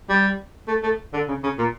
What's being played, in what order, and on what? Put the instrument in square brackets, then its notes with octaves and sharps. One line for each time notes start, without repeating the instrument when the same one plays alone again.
[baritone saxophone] G3
A3
A3
D3
C#3
C#3
A#2